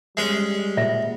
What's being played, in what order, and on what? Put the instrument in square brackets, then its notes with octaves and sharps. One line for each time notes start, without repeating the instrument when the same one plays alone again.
[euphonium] G3 [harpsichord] G#3 C#4
[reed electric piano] A#2 [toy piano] E5